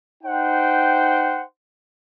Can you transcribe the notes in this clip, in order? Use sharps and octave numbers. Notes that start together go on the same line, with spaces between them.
D#4 C5 F#5 G5